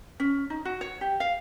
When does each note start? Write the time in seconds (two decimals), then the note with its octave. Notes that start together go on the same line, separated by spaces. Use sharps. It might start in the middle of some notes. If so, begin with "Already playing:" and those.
0.20 C#4
0.50 D#4
0.65 F#4
0.81 C#5
1.01 G4
1.20 F5